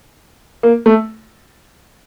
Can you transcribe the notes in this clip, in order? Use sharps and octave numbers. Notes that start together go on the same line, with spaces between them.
A#3
A3